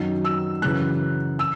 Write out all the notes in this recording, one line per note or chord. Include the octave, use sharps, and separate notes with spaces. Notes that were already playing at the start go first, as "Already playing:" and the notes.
Already playing: F#2 D#3 F#3
E6
F#2 C#3 E3 F#6
E6